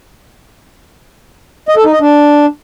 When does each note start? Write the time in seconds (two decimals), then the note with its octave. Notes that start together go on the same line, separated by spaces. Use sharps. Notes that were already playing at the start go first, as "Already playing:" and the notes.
1.69 D#5
1.76 A4
1.84 D#4
1.92 D#5
2.00 D4